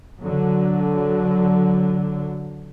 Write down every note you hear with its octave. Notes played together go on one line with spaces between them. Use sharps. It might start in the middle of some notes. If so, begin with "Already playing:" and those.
D3 F#3